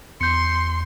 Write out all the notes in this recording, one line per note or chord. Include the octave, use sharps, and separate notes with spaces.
E2 C6 G6 C#7